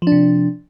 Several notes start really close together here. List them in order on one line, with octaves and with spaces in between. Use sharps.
F3 D4 C3